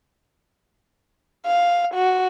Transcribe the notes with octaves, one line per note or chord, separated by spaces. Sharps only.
F5
F#4